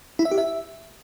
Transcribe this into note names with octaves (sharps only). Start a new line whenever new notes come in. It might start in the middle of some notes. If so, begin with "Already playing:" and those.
E4
E5
G4
E5